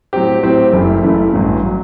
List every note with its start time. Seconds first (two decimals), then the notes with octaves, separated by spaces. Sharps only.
0.13 A2 F#3 C4 G4
0.43 A2 F#3 C4 G4
0.73 F#1 F#2 E3 A3 E4
1.02 F#1 F#2 E3 A3 E4
1.32 A1 G2 F#3
1.66 F#3